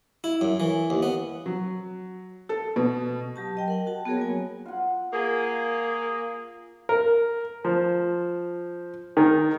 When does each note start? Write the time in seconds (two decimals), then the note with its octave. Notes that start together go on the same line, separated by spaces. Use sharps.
0.24 E4
0.41 F#2
0.60 E3
0.90 D#2
1.03 B3
1.46 F#3
2.49 A4
2.76 B2
3.36 F#3 G4 A5
3.55 F#3 D#5 G5
3.68 A#4 F#5 G5
3.87 F#4 F#5 A5
4.05 B3 F#4 G#4 A#4 C#5
4.17 F#3 A#3 B3 G#5
4.66 F4 F#5
5.13 A#3 G#4
6.89 A#4
7.65 F3
9.17 D#3